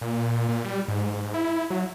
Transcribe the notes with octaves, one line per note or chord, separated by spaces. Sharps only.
A#2
A#2
G3
G#2
E4
F#3